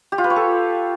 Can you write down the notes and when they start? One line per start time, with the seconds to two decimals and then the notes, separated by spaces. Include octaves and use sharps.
0.12 G4
0.18 F4
0.24 B4
0.30 C#5
0.36 A4